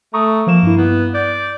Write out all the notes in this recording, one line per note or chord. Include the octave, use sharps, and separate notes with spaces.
A3 A#5 C#6 D#6
F3 A#3 E7
G2 E4
B3
D5 G6